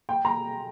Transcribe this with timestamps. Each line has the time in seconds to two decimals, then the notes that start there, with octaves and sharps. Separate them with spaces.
0.09 G5
0.25 A#5